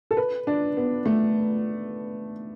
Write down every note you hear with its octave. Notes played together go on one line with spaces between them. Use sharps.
A4
B4
D4
B3
A3